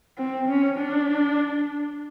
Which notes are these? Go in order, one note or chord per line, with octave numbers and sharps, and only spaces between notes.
C4
C#4
D4